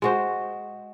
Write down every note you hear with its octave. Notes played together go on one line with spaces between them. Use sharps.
G#3 F#4 C5